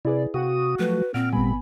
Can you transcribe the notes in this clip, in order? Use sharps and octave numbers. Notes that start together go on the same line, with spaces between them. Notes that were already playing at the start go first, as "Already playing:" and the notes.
C3 E4 G#4 B4 D5
C3 F#4 F5 G5 D#6
F3 F#3 A3 B4
A#2 C4 F#5 F6 D7
G#1 A#2 G3 B3 G#5 B5